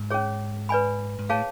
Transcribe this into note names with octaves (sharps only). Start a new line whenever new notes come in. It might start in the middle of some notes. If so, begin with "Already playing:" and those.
Already playing: G#2
C#4 G#4 C#5
B4 D5 G#5 B5
G#2
A2 G#4 C#5 F5 A5